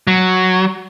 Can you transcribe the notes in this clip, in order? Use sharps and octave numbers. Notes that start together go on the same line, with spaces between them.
F#3